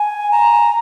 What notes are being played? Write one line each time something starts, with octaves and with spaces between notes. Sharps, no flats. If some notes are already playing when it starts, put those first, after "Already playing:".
Already playing: G#5
A#5